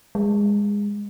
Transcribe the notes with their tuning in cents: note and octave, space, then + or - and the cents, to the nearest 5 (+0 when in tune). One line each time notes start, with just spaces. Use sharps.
G#3 -20